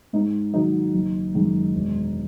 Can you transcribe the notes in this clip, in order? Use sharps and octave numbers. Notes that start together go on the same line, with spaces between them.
G#2 D#4
D#3 F#3 D#4
F#1
F#2 D#3 G#3
E1